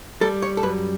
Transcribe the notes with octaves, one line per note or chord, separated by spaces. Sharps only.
G3 A4
C#5
A4
F#2 B4